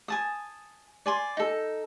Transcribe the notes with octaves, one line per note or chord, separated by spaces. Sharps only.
G#5 A5 D#6
D5 G#5 C6
D#4 A4